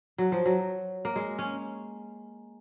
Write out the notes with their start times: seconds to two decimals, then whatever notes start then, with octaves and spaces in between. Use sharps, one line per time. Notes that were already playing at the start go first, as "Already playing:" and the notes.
0.18 F#3
0.32 F3
0.46 F#3
1.05 A#3
1.16 G#3
1.39 C#4